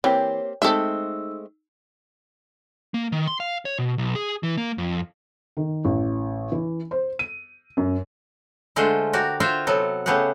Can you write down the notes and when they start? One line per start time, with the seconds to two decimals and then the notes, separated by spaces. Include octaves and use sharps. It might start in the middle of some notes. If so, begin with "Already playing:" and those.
0.04 E3 A#3 C4 G4 C#5
0.62 G#3 A3 C4 D#4 A4 E5 E6
2.94 A#3
3.12 D#3
3.27 C6
3.40 F5
3.65 C#5
3.79 B2
3.98 B1
4.15 G#4
4.43 E3
4.58 A#3
4.78 F2
5.57 D#3
5.85 A1
6.52 E3
6.91 C5
7.19 D#7
7.77 F#2
8.76 D3 G#3 A3 F4 C5 F#5
9.13 F#4 G4 A#4 D5
9.40 F4 F#4 C5 E5 F5 G5
9.67 C3 F#3 B3 A4
10.06 C#3 A3 B3 G4 G#4 F#5